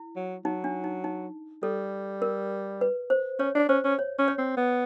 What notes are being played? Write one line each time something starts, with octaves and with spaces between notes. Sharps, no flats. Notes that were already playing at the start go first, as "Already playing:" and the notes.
Already playing: E4
F#3
F#3 D#4
D4
D#4
D#4
G3 A4
A#4
B4
C5
C#4 C#5
D4
C#4 C5
C#4
C#5
C#4
C#5
C4
B3